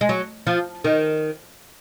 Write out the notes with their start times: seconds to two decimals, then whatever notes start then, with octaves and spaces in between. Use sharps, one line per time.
0.01 G#3
0.09 F#3
0.47 F3
0.84 D#3